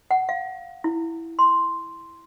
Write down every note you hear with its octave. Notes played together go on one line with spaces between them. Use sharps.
F#5
F5
E4
C6